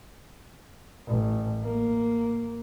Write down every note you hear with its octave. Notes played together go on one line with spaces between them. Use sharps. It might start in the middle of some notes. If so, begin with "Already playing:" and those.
A1
A#3